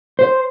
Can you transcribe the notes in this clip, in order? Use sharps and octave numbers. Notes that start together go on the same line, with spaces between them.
C5